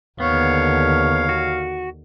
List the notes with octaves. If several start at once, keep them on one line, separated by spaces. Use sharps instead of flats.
D#2 D3 B3 C#5 F5
F#4